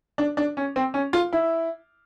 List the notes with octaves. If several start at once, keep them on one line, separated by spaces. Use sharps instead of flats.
D4
D4
C#4
C4
C#4
F4
E4